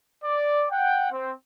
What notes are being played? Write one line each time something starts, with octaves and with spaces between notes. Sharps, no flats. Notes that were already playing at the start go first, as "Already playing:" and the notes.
D5
F#5 G5
C4